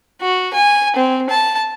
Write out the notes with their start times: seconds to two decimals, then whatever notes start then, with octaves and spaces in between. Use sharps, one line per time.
0.21 F#4
0.54 G#5
0.96 C4
1.29 A5